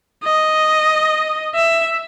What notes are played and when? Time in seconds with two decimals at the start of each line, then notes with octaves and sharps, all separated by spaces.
0.24 D#5
1.55 E5